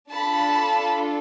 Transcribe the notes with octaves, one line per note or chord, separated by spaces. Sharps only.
D4 F4 A4 A5 B5